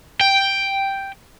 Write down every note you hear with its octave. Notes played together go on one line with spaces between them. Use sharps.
G5